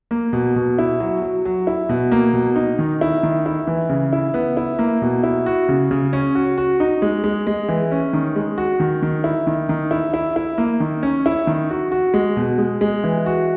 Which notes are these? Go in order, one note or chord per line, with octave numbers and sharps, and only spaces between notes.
A#3
B2
B2
E4
F#3
F#3
F#3
E4
B2
A#3
B2
D#4
D#3
E4
D#3
E4
E3
C#3
E4
B3
E4
A#3
B2
E4
F#4
C#3
C#3
C#4
F#4
F#4
D#4
G#3
G#3
G#3
E3
C#4
D#3
G#3
F#4
D#3
D#3
E4
D#3
D#3
E4
E4
E4
A#3
D#3
C#4
E4
D#3
F#4
F#4
G#3
B2
G#3
G#3
E3
F#4